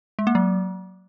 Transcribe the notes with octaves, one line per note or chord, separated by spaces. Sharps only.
G#3
A#3
F#3